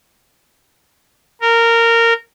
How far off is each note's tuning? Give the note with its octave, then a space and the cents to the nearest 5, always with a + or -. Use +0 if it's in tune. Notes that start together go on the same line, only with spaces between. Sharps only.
A#4 -15